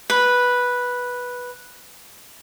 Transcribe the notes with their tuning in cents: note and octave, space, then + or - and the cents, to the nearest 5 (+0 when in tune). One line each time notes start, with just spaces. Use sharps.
B4 -5